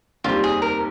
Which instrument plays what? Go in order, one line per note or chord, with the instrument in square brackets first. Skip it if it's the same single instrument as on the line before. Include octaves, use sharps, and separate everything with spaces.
[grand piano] F1 D#2 D#3 G3 C4 [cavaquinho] F4
[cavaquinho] G#4
A#4